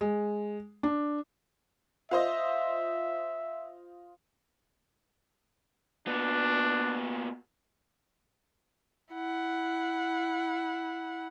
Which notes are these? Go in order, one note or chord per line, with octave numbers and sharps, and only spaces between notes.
G#3
D4
F4 C5 D#5 E5
A#2 B3 D4
E4 F#5